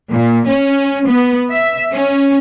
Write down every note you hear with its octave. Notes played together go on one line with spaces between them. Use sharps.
A#2
C#4
B3
E5
C#4